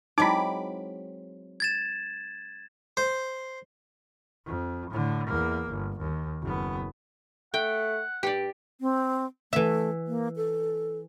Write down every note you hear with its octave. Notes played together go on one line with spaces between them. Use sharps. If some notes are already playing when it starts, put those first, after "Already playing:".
F#3 G#3 C4 D#4 E4 B5 D6
G#6 A6 E7
C5
F2
A2 D3
E2 A#3
G1
D#2
F#1 B3
A3 F#5 G5
G2 G4 D5
C4
E3 A3 E5
A#3
A4